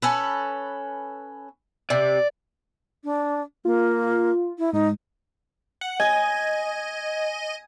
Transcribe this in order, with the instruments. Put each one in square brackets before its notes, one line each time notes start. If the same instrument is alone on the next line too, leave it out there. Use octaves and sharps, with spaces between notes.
[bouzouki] C#4 A4 B4
[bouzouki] C3 [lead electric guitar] D5
[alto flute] D4
[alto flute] A#3 [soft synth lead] F4
[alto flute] E4
[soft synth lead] G#2 [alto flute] D#4
[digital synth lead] F#5
[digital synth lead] D#5 [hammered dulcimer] G#5